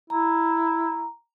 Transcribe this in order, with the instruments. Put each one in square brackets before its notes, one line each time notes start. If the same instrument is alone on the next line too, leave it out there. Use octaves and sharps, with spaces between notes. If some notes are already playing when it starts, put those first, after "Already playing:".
[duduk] E4 [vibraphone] A#5